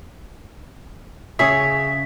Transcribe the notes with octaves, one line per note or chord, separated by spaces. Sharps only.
C#3 G#4 C#5 E5 D#6 B6